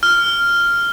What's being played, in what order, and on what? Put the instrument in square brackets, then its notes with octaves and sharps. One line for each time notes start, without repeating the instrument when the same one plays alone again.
[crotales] F6